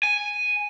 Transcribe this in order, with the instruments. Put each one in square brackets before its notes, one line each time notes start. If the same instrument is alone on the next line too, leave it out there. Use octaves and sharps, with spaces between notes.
[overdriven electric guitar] G#5